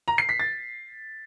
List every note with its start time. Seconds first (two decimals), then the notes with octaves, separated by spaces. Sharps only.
0.08 A#5
0.18 C7
0.29 B6
0.40 A6